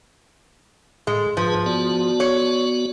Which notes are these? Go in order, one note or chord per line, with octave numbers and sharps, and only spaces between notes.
A2 G#3
G#2 F3 G#4 B4
B3 F#4 D5
C#5